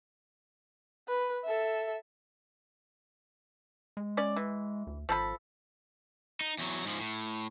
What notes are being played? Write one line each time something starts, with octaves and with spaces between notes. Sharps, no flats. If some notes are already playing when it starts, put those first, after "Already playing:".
B4
A4 E5
G#3
C#4 D5
E3
D2
G#1 F3 A4 B5
D#4
E2 F#3
G#2 F3
A2